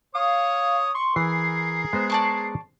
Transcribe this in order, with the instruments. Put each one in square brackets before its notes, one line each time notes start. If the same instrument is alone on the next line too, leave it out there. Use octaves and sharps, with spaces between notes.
[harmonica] C#5 D#6 [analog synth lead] F5
[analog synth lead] C6 [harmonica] C#6
[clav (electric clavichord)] E3 [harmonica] G#4 A#4 [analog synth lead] C7
[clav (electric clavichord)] G#3 B3 C5
[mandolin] D5 A5 C#6